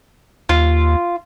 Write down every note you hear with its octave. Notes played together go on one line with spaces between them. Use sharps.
D#2 F4